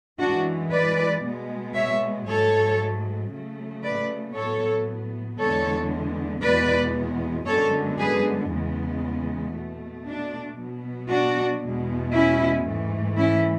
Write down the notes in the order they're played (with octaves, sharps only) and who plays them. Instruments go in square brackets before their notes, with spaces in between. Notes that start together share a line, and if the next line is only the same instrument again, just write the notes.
[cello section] F#2 E3 G#3 D4 F#4
B4 D5
B2 G#3 B3
C#5 E5
G#2 F#3 A3 A4 C#5
C#3 F#3 A3
B4 D5
A2 F#3 B3 A4 C#5
E2 D3 G#3 B3 A4 C#5
E2 B2 G#3 B3 B4 D5
F#2 D3 G#3 B3 A4 C#5
G#4 B4
E2 C#3 G#3 B3
B2 A3
D4
B2 F#3 B3
D4 F#4
E2 B2 G#3 B3
C#4 E4
G#2 E3 A3
C#4 E4